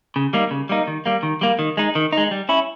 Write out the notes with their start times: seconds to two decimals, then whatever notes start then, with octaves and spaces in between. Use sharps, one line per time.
0.16 C#3
0.33 G3 A#3 D#4
0.51 C#3
0.69 G3 A#3 D#4
0.87 D#3
1.06 G3 A#3
1.23 D#3
1.41 G3 A#3
1.59 D#3
1.77 G#3 D#4
1.95 D#3
2.13 G#3 D#4
2.31 G3
2.49 C#4 E4